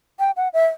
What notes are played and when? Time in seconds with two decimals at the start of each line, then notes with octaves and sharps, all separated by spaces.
0.19 G5
0.37 F#5
0.54 E5